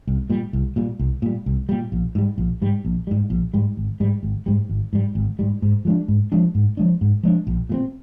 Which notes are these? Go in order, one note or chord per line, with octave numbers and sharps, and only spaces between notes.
C2
A#2 G3
C2
A#2 G3
C2
A#2 G3
C2
A#2 G3
A#1
G#2 G3
A#1
G#2 G3
A#1
G#2 G3
A#1
G#2 G3
G#1
G#2 G3
G#1
G#2 G3
G#1
G#2 G3
G#1
G#2 G3
G#2
F3 G#3 D4
G#2
F3 G#3 D4
G#2
F3 G#3 D4
G#2
F3 G#3 D4
A#1
A#2 G3 C4